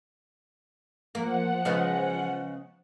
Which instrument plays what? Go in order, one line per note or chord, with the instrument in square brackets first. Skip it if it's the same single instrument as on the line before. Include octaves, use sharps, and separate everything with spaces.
[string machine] F3 F#5 [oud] A#3
[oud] C#3 G#3 B3